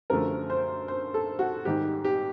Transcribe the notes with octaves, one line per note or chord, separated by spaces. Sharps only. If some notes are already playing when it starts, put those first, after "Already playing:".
F#2 D3 F3 A3 A#4
C5
C5
A4
F#4
G#2 D#3 G3 G4
G4